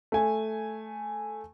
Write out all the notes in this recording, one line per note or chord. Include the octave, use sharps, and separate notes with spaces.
A3 G#5